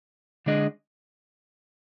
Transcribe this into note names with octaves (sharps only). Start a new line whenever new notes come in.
D3 G#3 D4 G#4 D#5